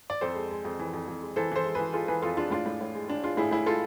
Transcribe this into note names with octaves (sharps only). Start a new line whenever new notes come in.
D5
F2 A4 C5
G#3
G#3
F2
E3
F2
F2
G#3
E3 A4 C5
E3 A4 C5
G#3
E3 G#4 B4
G#3 F4 A4
E3 G#4 B4
F2 F4 A4
G#3 D4 F4
A2 D4 F4
A2
A2
G#3
G#3 D4
G#3 D4 F4
A2 E4 G#4
A2 E4 G#4
G#3 F4 A4